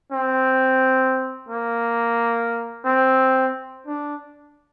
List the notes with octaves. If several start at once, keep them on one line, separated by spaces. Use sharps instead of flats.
C4
A#3
C4
D4